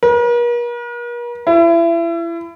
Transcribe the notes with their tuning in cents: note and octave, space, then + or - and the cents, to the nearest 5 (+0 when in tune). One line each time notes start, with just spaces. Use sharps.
A#4 +45
E4 +30